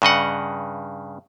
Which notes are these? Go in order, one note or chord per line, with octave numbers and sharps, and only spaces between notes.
G2 C#3 D#5 F#5